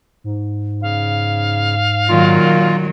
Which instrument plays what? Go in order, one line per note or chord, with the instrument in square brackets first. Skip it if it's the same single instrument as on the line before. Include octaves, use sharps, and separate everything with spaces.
[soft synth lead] G#2
[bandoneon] C#3 [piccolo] F5
[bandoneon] A#2 F4 [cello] D#3 F#3